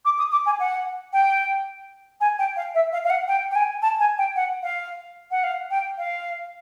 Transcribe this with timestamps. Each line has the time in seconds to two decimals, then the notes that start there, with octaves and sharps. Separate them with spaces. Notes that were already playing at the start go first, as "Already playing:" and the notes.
0.05 D6
0.18 D#6
0.32 D6
0.46 G#5
0.59 F#5
1.13 G5
2.20 G#5
2.39 G5
2.56 F5
2.74 E5
2.92 F5
3.05 F5
3.10 F#5
3.28 G5
3.51 G5
3.55 G#5
3.82 A5
3.99 G#5
4.18 G5
4.36 F#5
4.63 F5
5.31 F#5
5.43 F5
5.70 G5
5.98 F5